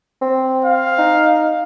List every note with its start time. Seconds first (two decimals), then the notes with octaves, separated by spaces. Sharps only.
0.22 C4
0.65 F5
0.98 D#4